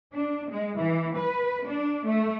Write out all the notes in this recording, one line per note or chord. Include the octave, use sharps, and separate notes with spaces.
D4
G#3
E3
B4
D4
A3